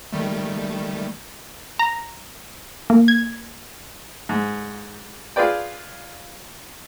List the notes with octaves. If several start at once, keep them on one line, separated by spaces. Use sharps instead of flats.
D#3 G3 A3
A#5
A#3
G#6
G#2
F4 G#4 B4 D5 G5